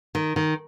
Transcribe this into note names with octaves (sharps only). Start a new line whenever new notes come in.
D#3
D#3